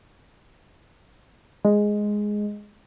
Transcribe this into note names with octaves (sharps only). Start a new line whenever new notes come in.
G#3